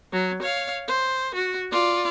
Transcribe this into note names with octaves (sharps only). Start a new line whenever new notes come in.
F#3
C#5 F5
C5
F#4
F4 D5